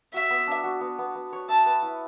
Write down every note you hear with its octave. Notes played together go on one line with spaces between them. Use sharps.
F#4 E5
B3
D4
F#4
B3
B3
B3
C#5
E5 A5
B4
E4